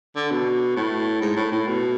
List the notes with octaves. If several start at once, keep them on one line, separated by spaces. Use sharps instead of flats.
D3
B2
A2
G#2
A2
A2
B2